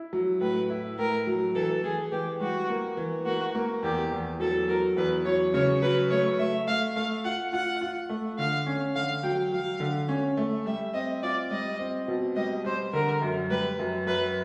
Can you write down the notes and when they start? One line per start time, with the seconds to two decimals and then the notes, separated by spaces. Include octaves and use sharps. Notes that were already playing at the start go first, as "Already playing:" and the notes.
Already playing: E4
0.13 F#3
0.41 A2 B4
0.70 E4
0.98 A2 A#4
1.27 F#3
1.55 E3 A4
1.83 E3 G#4
2.12 E3 G4
2.40 G3 F#4
2.69 A#3
2.97 E3
3.25 A#3 F#4
3.55 A#3
3.83 E2 G4
4.12 E2
4.40 F#3 A4
4.68 F#3 A#4
4.97 E2 B4
5.25 F#3 C#5
5.54 C#3 C#5
5.82 F#3 B4
6.10 A3 C#5
6.39 A3 E5
6.67 A3 F5
6.96 A3 F5
7.24 F4 F#5
7.52 F4 F#5
7.81 F4
8.09 A3
8.38 D3 F5
8.66 C#4
8.95 D3 F5
9.23 F#3 G5
9.52 F#3 F5
9.80 D3
10.09 C#4
10.37 A3
10.66 G3 E5
10.94 C4 D#5
11.23 F4 D5
11.51 G3 D#5
11.79 C4
12.08 B2
12.36 G3 D#5
12.64 G3 C5
12.93 D3 A#4
13.22 F#2
13.50 G3 B4
13.79 F#2
14.07 F#2 B4